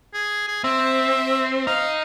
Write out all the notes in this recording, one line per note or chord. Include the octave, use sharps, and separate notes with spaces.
G#4
G#4
C4 E5
D#4 F5